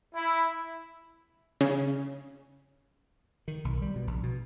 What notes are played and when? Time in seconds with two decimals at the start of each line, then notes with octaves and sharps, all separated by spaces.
0.14 E4
1.61 C#3
3.48 D#3
3.65 B1
3.82 G3
3.96 B2
4.07 A#1
4.23 B2